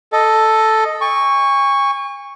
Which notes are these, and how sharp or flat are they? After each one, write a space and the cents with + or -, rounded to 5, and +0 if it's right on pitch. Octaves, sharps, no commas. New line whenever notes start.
A4 +0 D#5 +0
G#5 -40 C#6 +0